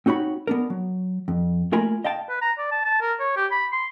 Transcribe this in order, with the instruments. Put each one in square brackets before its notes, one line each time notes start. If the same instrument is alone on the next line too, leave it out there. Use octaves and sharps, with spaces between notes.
[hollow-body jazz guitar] C4 D#4 F#4 C#5 B5
B3 D4 A#4
F#3
F2
A3 A#3 F4 A#4 G#5 B5
D#5 F5 G5 A5
[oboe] B4
A#5
D5
A5
A5
A#4
C#5
G4
B5
C6